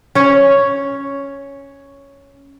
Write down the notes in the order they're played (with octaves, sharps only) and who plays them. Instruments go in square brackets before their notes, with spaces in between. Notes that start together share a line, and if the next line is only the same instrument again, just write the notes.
[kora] C#4 C#5